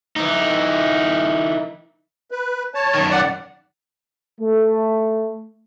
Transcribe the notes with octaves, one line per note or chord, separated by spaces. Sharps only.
E3 D#4
B4
C#5 A5
F#2 D#3
D5 F#5
A3